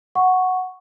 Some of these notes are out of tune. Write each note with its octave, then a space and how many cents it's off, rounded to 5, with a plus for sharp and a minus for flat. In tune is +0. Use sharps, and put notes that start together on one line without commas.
F#5 +0 C#6 +0